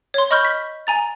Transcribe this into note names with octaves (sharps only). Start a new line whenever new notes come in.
C#5 C6
D#5 B5 C#6 F6 G6 G7
B6
G#5 A#5 A6